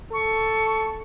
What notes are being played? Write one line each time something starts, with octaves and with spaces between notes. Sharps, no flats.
A4 C#6